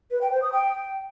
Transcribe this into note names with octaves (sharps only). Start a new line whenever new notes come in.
B4
G5
C5
D#6
G5